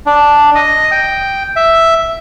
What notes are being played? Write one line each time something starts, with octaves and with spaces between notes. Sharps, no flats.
D4
D#5
G5
E5